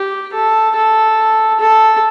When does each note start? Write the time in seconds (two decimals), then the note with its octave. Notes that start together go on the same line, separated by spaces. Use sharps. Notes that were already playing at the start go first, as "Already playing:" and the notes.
Already playing: G4
0.34 A4
0.76 A4
1.60 A4